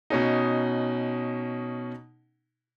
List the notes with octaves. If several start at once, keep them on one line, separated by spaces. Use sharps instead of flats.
B2 C#4 D#4